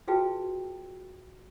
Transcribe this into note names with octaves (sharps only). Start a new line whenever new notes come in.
F4 F#4 G#4 B4 G5 A5